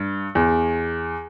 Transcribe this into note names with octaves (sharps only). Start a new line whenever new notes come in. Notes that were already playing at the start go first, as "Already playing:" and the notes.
Already playing: G2
E2